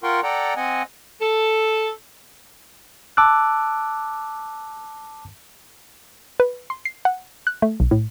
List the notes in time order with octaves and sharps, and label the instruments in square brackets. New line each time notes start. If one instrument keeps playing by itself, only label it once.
[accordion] F4 A#4 F#5 G5 C6 C#6
A4 D5 F#5 G5 A#5
C4 D#5 F#5 G#5
[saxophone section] A4
[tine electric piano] A5 D6 E6 F#6
[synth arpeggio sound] B4
C6
C7
F#5
F#6
A3
B1
A2